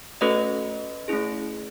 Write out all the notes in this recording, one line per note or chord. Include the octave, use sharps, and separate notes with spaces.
A3 C#4 F#4 A4 B4 D#5
A3 C#4 E4 G#4